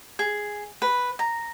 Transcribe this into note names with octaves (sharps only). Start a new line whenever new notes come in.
G#4
B4
A#5